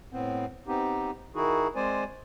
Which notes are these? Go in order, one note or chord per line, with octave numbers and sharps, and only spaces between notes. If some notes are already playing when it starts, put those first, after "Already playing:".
A2 B3 C4
B3 C4 D#4 G4
D#3 D#4 E4 F#4 G#4
G#3 C4 C5 D5 G#5